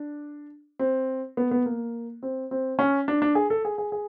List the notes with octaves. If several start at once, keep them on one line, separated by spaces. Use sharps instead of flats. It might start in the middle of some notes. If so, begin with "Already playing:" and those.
Already playing: D4
C4
B3
B3
A#3
C4
C4
C#4
D4
D4
G#4
A4
G#4
G#4
G#4